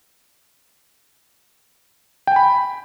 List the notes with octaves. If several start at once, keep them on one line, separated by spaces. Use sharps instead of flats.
G5 G#5 B5